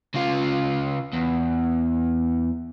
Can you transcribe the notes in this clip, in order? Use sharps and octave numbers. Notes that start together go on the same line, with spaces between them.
C#3 F4
E2